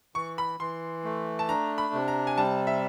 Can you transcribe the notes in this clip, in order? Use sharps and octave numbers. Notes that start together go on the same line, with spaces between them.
E3 C#6
B5
E3 C6
A3
A5
D4 A#5
B5
C3
A#5
G#5
G3 A5
E5